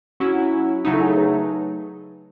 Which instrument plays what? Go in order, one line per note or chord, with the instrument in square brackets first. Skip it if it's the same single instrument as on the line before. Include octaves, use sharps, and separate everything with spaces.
[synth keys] F#3 C#4 E4 [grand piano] F#4
[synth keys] C#3 F#3 A3 D#4 [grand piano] E4
[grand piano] A4
G#4
B4